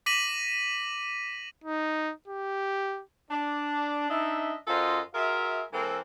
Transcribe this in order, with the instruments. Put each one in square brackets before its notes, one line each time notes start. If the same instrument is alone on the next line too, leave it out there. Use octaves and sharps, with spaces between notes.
[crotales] D6 A#6 B6 D#7 F#7
[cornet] D#4
G4
[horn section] D4
D4 D#4 D#5 E5
F#2 F4 A4 C5 D#5
F4 F#4 G#4 A#4 E5
E3 G#3 A#3 C4 A4 A#4